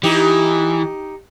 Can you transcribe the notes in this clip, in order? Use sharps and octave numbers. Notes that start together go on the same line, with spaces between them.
E3 D#4 G4